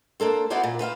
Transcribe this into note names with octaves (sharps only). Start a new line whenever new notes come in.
A#3 D4 A4 C5
B3 E4 F#4 B4 C5 D5
A#2
B4 C5 E5 F5